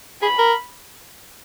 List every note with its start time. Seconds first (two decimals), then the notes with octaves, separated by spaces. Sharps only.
0.22 G#4 B5
0.39 A#4